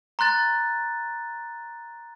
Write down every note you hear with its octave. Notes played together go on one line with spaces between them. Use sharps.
A#5 C6 F#6 A6